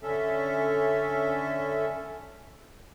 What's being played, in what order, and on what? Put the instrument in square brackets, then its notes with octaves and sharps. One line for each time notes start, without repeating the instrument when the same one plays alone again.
[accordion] D3 C#4 A4 E5